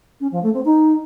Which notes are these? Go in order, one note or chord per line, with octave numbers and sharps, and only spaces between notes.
C#4
F3
A3
C4
D#4